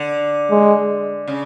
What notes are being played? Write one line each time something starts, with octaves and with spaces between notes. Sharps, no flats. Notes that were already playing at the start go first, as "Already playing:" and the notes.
Already playing: D3
G#3
C#3